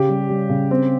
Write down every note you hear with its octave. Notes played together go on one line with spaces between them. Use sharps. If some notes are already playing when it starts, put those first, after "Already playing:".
Already playing: C#3 G4
G3
G3
C#3
C4